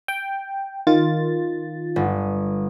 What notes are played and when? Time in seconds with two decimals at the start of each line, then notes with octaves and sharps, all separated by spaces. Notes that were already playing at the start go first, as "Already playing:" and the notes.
0.08 G5
0.87 D#3 F4 A6
1.96 G1